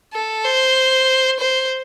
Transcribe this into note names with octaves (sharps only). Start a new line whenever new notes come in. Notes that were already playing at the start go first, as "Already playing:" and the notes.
A4
C5
C5